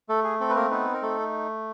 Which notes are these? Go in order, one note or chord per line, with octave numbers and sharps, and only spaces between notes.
A3 A4
G#4
C4 A4
B4
A#3 A#4
B3 D#4 B4
A#4
A3 A4